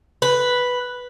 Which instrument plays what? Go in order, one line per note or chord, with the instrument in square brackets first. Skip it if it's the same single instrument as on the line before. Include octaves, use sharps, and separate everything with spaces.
[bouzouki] B4